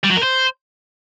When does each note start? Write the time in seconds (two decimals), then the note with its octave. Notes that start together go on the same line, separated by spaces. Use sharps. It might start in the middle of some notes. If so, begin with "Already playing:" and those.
0.04 G3
0.11 F#3
0.17 A#4
0.23 C5